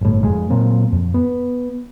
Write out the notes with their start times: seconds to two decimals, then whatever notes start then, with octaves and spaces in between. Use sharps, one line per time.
0.01 G1 A2
0.24 F2 G#3
0.50 A#2 F#3 A#3 C4
0.92 F2
1.14 B3